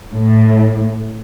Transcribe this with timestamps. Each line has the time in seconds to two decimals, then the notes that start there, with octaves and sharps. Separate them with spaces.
0.12 A2